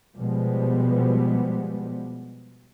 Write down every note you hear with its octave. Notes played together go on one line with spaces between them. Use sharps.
B2 F3 G3 G#3 B3